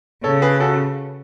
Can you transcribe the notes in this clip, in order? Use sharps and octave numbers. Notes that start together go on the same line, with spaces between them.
C#3 A4 C#5
G#4 B4
F#4 A4